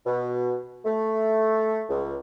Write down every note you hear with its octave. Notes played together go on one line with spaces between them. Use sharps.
B2
A3
C#2